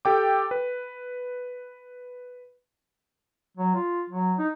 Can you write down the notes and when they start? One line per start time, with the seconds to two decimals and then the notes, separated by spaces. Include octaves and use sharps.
0.05 G4 A4 G5 D6
0.51 B4
3.57 F#3
3.75 F4
4.10 F#3
4.38 D#4